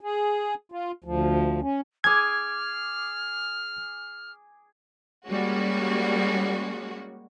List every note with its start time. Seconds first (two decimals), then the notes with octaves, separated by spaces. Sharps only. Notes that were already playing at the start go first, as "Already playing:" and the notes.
0.01 G#4
0.72 F4
1.04 D2 F3
1.61 C#4
2.04 G#4 D6 F6 G#6
5.28 G3 G#3 A#3 C#4 F#4